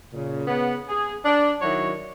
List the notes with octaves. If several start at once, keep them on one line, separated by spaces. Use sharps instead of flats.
A#2 C#3
C#3 B3
G#4
D4
D#3 F#3 E4 F#4 C#5